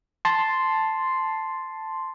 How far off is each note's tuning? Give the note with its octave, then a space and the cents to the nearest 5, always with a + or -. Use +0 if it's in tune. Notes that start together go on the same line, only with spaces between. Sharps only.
A5 +0 C6 +0